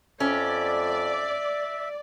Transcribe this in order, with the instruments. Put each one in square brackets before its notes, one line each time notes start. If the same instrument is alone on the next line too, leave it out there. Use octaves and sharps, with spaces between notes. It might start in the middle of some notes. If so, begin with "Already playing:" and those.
[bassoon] F2 [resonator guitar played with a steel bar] C#4 [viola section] D5 [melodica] E5